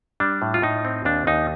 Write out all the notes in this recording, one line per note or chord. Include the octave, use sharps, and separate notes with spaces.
G3 D4
A2
F4
A2 D#4
C4
D#2 D4
D#2 D#4